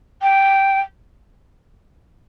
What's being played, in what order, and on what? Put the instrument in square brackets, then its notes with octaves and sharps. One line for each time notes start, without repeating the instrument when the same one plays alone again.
[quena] G5